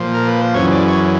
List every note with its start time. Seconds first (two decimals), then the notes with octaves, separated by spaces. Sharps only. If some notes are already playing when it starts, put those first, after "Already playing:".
Already playing: A#2 F3
0.14 A#4
0.28 B4
0.41 C5
0.54 F#2 C#3 E3 C#5
0.72 D5
0.88 C#5